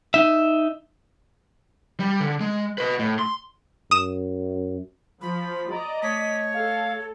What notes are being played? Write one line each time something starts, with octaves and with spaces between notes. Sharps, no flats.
D#4 E5
G3
D3
G#3
B4 D#5
A2
C6
F#2 D#6 E7
F3 B5
D5 D#5 A#5
A3 C#5 B6
A4 F5